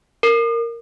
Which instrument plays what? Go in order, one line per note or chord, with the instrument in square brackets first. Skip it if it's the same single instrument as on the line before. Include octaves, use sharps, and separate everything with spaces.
[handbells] A#4